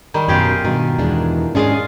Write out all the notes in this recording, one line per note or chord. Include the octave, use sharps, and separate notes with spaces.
D#3 G3
F#2 B2 F4 G4 G#4
G2 B2 D#3
E2 G#3 D4
G#2 C#4 D4 F4 G#4 D#5 F5